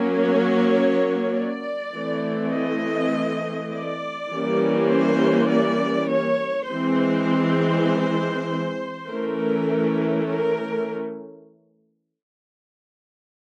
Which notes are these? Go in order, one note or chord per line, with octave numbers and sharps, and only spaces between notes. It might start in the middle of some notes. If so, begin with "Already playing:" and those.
Already playing: F#3 A#3 C#4
C#5
D5
E3 A3 C4
D#5
D5
E3 G3 A#3 C#4
C5
D5
C#5
E3 G#3 C4 C5
E3 A3 C#4 A#4
A#4